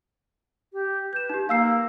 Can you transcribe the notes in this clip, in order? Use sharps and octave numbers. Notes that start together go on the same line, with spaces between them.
G4
B4 G6 E7
D#4 G4
A#3 F5 E6 C7